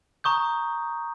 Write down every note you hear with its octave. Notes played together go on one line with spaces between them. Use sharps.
A#5 C#6 D#6 G6